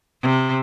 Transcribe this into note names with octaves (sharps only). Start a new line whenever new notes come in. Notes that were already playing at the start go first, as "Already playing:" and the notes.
C3